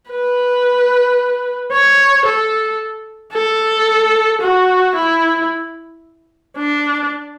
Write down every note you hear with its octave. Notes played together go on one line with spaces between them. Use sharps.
B4
C#5
A4
A4
F#4
E4
D4